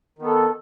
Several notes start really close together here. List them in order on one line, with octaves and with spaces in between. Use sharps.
D#3 B3 A4